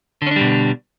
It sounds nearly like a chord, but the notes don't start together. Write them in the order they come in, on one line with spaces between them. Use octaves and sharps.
D3 C#4 D4 G3 B2